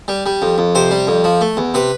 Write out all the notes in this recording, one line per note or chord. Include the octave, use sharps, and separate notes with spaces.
G3
G3
F2
F2
C3 C5
G3
F2
F3
A3
E2
C3 B4